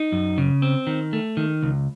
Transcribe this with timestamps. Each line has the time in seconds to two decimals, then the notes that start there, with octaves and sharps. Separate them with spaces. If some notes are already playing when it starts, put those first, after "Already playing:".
Already playing: D#4
0.12 F#2
0.38 C#3
0.62 C4
0.87 D#3
1.13 A3
1.37 D#3
1.63 C#2